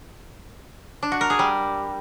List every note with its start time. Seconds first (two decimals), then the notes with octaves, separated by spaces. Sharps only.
1.03 D4
1.12 F#4
1.21 A#4
1.30 G#4
1.39 G3